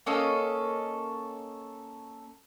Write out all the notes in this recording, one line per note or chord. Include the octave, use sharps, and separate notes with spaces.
A#3 C#4 A4 D#5